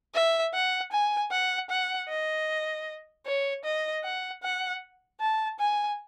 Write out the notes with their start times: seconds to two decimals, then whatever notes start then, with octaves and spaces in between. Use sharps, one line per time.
0.15 E5
0.54 F#5
0.92 G#5
1.32 F#5
1.70 F#5
2.09 D#5
3.26 C#5
3.64 D#5
4.04 F#5
4.43 F#5
5.20 A5
5.59 G#5